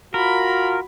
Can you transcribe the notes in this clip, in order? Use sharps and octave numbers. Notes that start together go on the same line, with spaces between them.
F4 F#4 A#4 B5